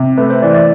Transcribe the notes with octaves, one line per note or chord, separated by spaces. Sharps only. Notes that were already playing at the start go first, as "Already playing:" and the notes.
Already playing: C3
A3 B4
C5
E3 D5
D5